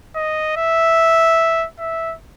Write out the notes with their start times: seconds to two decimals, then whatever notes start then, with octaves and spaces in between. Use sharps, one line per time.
0.16 D#5
0.57 E5
1.79 E5